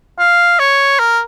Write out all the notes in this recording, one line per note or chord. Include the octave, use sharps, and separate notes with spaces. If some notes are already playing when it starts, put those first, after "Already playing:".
F5
C#5
A#4